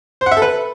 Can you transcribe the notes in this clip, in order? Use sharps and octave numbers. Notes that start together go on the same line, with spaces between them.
C5
F#5
E5
A4
B4